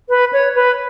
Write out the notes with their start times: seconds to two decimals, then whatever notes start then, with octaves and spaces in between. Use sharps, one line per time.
0.09 B4
0.33 C#5
0.55 B4